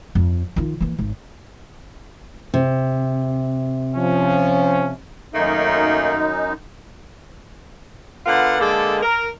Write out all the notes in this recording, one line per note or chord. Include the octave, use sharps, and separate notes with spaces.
F2
D#3 F4
E3 A#3
G#1
C3
F3 C#4
F#2 D#3 A3 A#3 D#4
D3 B3 F4 A#4 F#5
D3 G#3 A#3 G#4 A4
A#4